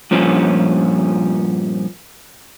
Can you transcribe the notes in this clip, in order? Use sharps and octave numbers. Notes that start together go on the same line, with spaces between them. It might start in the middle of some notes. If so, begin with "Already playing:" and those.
G2 A#2 F3 C#4